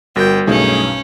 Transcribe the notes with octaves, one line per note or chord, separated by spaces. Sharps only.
G1 G3 F#4 A#4 G5 G6
B1 G2 A3 C#4 D#4 G#4